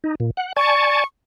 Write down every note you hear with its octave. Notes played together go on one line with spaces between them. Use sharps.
D#4
A#2
F#5
D5 G#5 A5 C#6